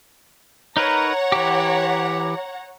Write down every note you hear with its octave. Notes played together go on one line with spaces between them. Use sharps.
D#4 A#4 B4 C#5 F#5 A#5
E3 G4